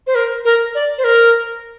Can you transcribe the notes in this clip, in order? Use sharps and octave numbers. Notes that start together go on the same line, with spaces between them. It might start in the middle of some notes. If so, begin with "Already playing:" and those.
C5
A#4
A#4
D5
C5
A#4